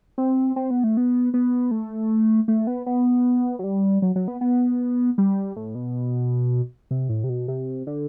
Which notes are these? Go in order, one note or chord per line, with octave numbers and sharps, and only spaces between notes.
C4
C4
B3
A3
B3
B3
A3
A3
B3
B3
F#3
G3
F#3
F#3
B3
B3
G3
A2
B2
C3
A2
C3
B2
C3
D3